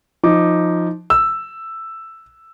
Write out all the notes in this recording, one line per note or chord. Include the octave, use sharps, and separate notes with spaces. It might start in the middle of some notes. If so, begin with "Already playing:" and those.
F3 D#4 D6
E6